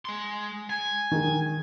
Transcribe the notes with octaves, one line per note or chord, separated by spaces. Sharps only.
G#3 C6
G#5
D#3 G#3